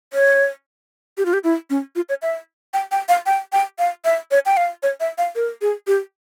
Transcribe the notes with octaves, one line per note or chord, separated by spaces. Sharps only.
C#5
G4
F4
G4
E4
C#4
F4
C#5
E5
G5
G5
F5
G5
G5
F5
E5
C#5
G5
F5
C#5
E5
F5
A#4
G#4
G4